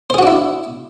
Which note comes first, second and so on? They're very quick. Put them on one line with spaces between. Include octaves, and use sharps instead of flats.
C5 G#4 F#4 D4 E4